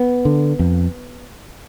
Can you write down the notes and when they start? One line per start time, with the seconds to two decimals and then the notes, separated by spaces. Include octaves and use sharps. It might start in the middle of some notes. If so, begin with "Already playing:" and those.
Already playing: B3
0.25 D3
0.59 F2